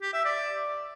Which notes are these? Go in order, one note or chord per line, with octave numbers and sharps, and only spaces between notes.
G4
E5
D5